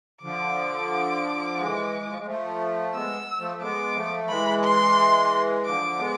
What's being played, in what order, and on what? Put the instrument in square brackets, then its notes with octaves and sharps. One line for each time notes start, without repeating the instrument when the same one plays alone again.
[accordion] D3 F3 [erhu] D6
[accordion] E3 G#3
E3
F3
G#3
F3 A3
[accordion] G#3 B3 [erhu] E6
[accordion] F3 A3
[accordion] G#3 B3 [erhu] D6
[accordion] F3 A3
F3
[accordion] E3 G#3 [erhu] B5
[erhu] C6
[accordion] D3 F3 [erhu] D6
[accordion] G#3 B3